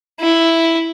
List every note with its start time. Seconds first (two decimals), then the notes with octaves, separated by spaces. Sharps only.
0.20 E4